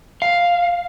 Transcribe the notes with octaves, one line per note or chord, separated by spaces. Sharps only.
F5